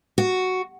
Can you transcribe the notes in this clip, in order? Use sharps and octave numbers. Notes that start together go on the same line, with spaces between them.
F#4